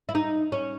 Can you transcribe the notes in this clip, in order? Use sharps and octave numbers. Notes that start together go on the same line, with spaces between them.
E4
D#4
C#4